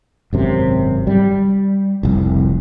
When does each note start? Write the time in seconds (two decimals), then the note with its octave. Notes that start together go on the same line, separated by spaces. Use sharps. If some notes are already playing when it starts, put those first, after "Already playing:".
0.33 G#1 F#2 C3
1.07 G3
2.03 F1 C2